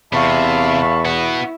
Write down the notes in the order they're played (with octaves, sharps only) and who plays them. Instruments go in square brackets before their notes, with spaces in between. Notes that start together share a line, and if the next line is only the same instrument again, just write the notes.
[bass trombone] E2 [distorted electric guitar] C3 [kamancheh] E5 F5 [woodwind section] A5 B5 C#6
[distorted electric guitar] B3 F#4 [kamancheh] E4